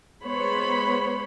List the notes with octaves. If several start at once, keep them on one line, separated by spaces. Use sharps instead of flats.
G#3 B3 C5 C#5 B5